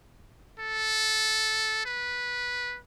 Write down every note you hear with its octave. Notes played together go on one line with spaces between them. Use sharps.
A4
B4